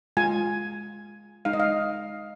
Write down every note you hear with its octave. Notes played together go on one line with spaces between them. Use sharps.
G#3 F4 G#5
G#3 D#4 F5
D#5
F5